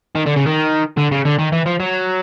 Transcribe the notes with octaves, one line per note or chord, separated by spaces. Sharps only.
D#3
D3
C#3
D#3
D3
C#3
D3
D#3
E3
F3
F#3